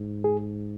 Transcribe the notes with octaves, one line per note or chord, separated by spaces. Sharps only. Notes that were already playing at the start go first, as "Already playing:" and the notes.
Already playing: G#2
G#4